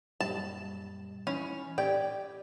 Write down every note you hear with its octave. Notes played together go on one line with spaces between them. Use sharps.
F#2 A#2 G3 A5
E3 C#4 D#4 B5
G4 D5 G5 G#6